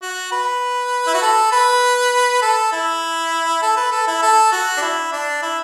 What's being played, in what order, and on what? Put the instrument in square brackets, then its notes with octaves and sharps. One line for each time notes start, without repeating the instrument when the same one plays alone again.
[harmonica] F#4
B4
E4
F#4
A4
B4
A4
E4
A4
B4
A4
E4
A4
F#4
D4
E4
D4
E4